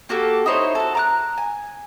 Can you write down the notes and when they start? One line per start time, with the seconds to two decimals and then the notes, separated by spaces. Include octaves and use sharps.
0.09 A#3 F#4 G4 A4
0.46 D#4 E4 C5 C#5
0.75 F#4 A4
0.95 A#5 D6 F#6
1.38 G#5